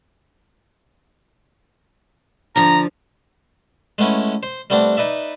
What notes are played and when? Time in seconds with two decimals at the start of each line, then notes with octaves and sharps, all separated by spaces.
2.56 D3 F3 A#5
3.98 G#3 A3 B3 C#4 E4
4.43 C5
4.70 G3 A3 B3 C4 D4
4.97 D#4 B4 D5 E5